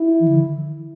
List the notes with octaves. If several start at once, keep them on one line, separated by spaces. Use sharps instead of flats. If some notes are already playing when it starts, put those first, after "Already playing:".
Already playing: E4
E3
D3